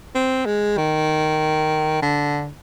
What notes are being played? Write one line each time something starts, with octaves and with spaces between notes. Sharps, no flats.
C4
G#3
D#3
D3